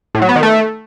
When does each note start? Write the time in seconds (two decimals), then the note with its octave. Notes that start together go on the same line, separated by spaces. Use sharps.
0.15 A2
0.22 F#3
0.29 B3
0.36 D#3
0.43 A3